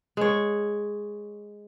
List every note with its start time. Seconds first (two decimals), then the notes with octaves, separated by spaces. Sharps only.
0.17 G#3 C#5